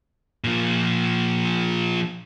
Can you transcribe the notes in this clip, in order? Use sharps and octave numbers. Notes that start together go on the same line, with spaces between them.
A#2 F3